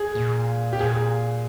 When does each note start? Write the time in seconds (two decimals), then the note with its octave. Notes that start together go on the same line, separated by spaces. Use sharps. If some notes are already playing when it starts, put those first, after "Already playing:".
Already playing: G#4
0.15 A#2
0.73 G4
0.79 A#2 G#4